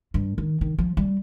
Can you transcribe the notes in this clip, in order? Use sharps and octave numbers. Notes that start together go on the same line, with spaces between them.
G2
D#3
D#3
F3
G3